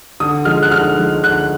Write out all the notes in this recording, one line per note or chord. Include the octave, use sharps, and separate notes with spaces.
D3 D#6
F3 G#3 F6
F#6
D3 F6
F3 G#3
D3 F#6